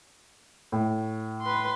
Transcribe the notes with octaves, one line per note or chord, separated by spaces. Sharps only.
A2
B4 C6